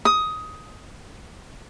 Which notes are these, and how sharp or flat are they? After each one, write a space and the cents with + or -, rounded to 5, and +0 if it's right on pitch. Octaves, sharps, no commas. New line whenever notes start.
D#6 +15